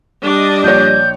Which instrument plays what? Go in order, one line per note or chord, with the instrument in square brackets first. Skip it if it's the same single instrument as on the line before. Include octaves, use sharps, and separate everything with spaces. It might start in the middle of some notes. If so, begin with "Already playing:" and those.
[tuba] G3 [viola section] D4 D#5
[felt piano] A#1 C#5 [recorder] G6